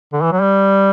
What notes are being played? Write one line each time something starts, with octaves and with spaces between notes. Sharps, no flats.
D3
E3
F#3
G3